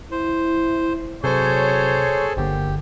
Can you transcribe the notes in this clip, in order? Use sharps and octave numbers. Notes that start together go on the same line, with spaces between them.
E4 C5
C3 F#3 G#4 A4 C5 C#5
G1 D3 A#3 G4